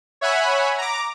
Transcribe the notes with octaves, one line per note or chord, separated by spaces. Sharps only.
C#5 E5 F#5 G#5 B5
A#5 D6